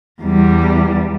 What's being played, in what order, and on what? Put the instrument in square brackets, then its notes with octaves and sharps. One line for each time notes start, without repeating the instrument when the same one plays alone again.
[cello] E2 G3